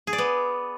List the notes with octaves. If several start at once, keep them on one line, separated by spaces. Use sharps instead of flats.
G#4
D5
B3